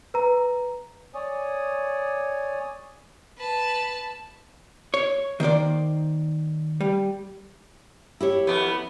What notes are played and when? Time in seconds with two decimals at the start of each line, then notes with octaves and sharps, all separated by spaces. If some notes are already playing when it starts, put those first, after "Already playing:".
0.14 B4 A#5
1.15 C#5 D5 G#5 D#6
3.37 B4 A5
4.94 C#5
5.40 D#3 A#3 C5 D5
6.81 G3
8.21 E4 G4 C#5
8.47 F2 B3